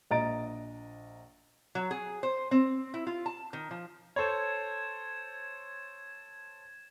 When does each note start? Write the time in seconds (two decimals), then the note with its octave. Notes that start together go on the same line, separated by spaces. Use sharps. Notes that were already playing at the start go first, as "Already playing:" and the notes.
0.11 A#1 D#5 A#5 A6 D7
1.75 F#3
1.91 G#4
2.23 C5
2.51 C4
2.94 E4
3.07 F4
3.26 A5
3.53 D#3
3.71 F3
4.16 A4 C5 C#5 G#6 A6 E7